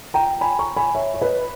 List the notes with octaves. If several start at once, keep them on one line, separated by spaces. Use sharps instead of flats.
G5 A#5
G#5 B5
A#5 C#6
G#5 B5
C#5 E5
C#5
B4 D#5